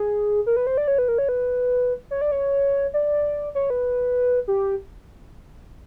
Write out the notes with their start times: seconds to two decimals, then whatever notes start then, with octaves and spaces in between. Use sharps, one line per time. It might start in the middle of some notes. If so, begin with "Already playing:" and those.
Already playing: G#4
0.46 A#4
0.56 B4
0.67 C5
0.78 D5
0.88 C#5
0.98 B4
1.08 A#4
1.18 C#5
1.29 B4
2.11 C#5
2.21 D5
2.32 C#5
2.94 D5
3.55 C#5
3.70 B4
4.48 G4